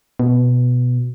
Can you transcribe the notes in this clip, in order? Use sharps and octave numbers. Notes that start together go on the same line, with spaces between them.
B2